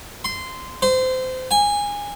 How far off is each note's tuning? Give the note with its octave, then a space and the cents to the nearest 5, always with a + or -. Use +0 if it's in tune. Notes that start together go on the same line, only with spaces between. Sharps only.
C6 -15
C5 -25
G#5 -20